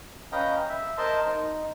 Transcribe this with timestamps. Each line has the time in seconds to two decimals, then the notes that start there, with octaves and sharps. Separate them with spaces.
0.32 C#4 B4 D#5 F5 G5 A#5
0.69 E5
0.98 A#4 C5 D#5 A5 C6
1.26 D#4